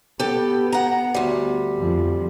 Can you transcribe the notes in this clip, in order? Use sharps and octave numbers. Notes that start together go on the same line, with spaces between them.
B3 G4 A4
F#5 A#5
D2 G3
F2 F3